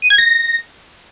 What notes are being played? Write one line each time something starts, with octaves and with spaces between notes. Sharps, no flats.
D#7
G#6
A#6